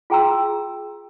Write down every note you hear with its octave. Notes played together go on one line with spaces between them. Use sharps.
F4 G#4 G5 A#5 C6 E6